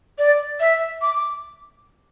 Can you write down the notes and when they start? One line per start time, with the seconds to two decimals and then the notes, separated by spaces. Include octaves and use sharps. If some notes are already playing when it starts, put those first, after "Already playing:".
0.18 D5
0.60 E5
1.02 D6